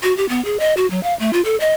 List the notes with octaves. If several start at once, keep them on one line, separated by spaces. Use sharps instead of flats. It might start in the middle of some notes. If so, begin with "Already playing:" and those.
F#4
G4
B3
G#4
D#5
F#4
F#3
F5
A3
F4
A4
D#5